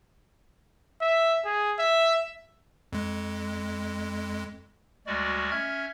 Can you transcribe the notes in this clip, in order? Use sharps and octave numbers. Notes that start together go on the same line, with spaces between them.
E5
G#4
E5
F2 G#3
D2 G3 G#3 F#4 D5
C#4 E5 F6 G#6